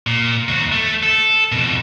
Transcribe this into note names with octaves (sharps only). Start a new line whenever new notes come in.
A#2
D#2 F#4
A3
A4
F2 B2